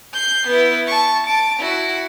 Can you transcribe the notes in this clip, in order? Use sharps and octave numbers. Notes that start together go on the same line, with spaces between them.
G6 C7
B3 E4
A5 C#6
A5 D7
E4 F#4